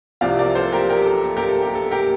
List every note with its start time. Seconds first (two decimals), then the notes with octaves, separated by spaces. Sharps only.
0.21 C2 C3 F3 C4 D5 F5
0.39 A#4 D5
0.55 A4 C5
0.73 G4 A#4
0.89 G4 A#4
1.06 A4
1.24 A4
1.37 G4 A#4
1.48 A4
1.62 G4
1.75 A4
1.91 G4 A#4